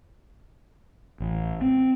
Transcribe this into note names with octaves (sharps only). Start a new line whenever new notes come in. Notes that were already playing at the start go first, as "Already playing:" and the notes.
A1
C4